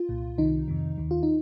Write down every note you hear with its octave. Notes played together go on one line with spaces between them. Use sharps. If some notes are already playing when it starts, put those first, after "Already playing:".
Already playing: F4
C2 A#2
C2 C3 D#3 D#4
F2 C3 D#3
D#2 D#3
F4
D#4